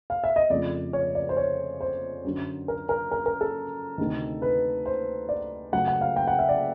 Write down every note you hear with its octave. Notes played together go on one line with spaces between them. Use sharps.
F5
E5
D#5
F2 C#3 F3 A3 D5
C#5
D5
C5
C#5
C5
F#2 D3 F#3
A#4
A#4
A#4
A#4
A4
D2 C3 D#3
B4
C5
D5
F#2 C#3 F#3 A3 F#5
F#5
F5
G5
F#5
E5
D5